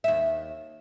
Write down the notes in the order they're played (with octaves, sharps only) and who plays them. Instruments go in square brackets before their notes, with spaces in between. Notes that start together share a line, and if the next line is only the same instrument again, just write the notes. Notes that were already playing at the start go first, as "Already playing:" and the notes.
[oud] D#2 E5